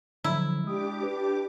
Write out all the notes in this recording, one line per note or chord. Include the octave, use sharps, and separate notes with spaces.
D3 F3 F#3 E4
G#3 D4 G4 D6 D#6
B4